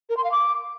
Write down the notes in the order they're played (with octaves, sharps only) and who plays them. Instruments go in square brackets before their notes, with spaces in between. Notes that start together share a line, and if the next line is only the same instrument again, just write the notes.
[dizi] A#4
C6
F5
D6